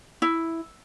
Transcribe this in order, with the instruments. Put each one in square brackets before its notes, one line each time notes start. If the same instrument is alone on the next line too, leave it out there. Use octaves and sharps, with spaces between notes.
[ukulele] E4